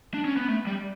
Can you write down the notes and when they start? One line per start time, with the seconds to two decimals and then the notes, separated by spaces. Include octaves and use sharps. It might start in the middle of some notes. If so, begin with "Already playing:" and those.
0.14 D4
0.25 C#4
0.37 B3
0.48 A3
0.67 G3